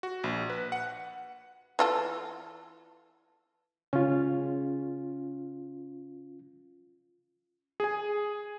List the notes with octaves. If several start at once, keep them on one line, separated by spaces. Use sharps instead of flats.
F#4
A#1
B4
F#5
E3 F4 A4
C#3 C#4 F4
G#4 G#5